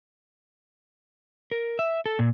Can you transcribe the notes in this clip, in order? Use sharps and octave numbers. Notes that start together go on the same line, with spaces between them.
A#4
E5
A4
A#2